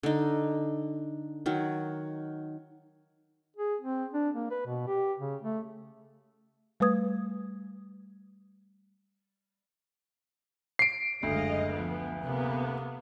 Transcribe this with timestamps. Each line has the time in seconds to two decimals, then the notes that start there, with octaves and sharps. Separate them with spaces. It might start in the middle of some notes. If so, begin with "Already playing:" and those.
0.03 D3 D#4
1.46 D#3 F#3
3.56 G#4
3.81 C4
4.14 D4
4.34 A#3
4.51 B4
4.66 B2
4.88 G4
5.18 C#3
5.42 A3
6.80 G3 A3 B4 D#6 G#6
10.79 C7 D7
11.23 F#1 D2 G#3 D#5 F5
11.73 F3 B3
12.23 C3 A#3 B3